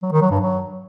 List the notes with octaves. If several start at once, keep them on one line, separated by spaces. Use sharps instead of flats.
F#3
D#3
F#3
G2
F#3